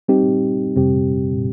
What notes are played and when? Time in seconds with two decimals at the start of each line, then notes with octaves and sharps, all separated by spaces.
0.08 G3 C4 D#4 G4
0.76 F2 C3 G3 C4 G4